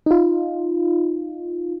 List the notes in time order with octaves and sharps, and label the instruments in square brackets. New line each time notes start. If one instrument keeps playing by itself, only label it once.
[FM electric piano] D#4 F4